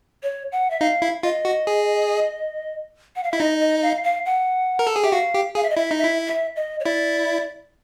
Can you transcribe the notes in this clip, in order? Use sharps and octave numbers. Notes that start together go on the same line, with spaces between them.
C#5
F#5
E5
D#4 F5
E4
F4 D#5
F#4
G#4
F#5
F5
E4 E5
D#4 D#5
D#5
F5
F5
F#5
A#4
A4
G#4
G4 E5
F#4 F5
G4
G#4 F5
E5
D#5
E4 E5
D#4
E5
E4
E5
D#5
C#5
E4 D5